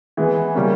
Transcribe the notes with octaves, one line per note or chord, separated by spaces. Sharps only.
E3 G#3 B3 G#4
C#3 G3 A#3 C#4